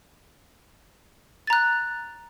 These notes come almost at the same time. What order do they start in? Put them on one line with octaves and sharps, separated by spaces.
A6 A#5 F#6